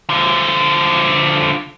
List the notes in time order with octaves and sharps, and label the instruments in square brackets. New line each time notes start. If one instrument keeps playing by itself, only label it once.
[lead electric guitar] D3 F3